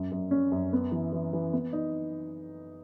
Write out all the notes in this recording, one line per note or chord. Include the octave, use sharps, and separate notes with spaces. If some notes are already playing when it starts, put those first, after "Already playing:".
Already playing: F#2
F#2
C#4
F#2
B3
E3
E3
E3
B3
D#4